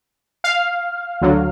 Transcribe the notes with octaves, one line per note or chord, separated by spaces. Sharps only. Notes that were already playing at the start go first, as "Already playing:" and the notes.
F5
D2 D3 F#3